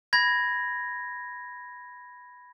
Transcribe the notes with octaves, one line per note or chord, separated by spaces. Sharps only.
B5 G#6 A#6